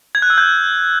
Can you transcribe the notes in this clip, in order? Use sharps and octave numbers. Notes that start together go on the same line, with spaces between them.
G#6
F#6
E6
G6